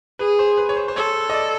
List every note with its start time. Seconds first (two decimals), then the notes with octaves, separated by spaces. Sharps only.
0.19 G#4 B4
0.39 C5
0.58 B4
0.69 C#5
0.77 C5
0.88 C5
0.96 A4 C#5
1.30 D#5
1.34 D5